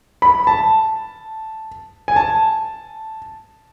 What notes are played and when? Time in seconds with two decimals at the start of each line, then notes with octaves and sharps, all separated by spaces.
0.22 B5
0.47 A5
2.08 G#5
2.16 A5